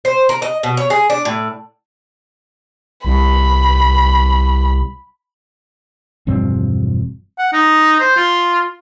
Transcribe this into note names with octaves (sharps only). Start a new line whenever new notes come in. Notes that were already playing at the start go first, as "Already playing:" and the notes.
C5
A#4
D#5
B2
C#5
G#4
D4
A2
C2 B5
E1 G2 F3 C4
F#5
D#4
C5
F4